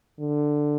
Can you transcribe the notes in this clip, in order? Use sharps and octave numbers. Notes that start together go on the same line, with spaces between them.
D3